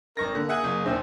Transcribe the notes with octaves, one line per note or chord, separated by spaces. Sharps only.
G#1 A#4 C#6 A#6
D3 A#3
G#4 E5 F#5 G#5
F#1
D#2 A#2 C5 E5